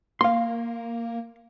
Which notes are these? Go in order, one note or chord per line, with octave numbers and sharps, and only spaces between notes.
A#3 F5 C6